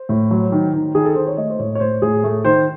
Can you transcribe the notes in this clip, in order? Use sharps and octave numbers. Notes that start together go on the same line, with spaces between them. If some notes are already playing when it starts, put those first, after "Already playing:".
Already playing: C5
A2
F#3
D#3
D#3
D#3 G#4
A4
D#3 C5
C#5
A3 D#5
C5
A2 C#5
C#5
A2 C5
A2 G#4
A3
D#3 C5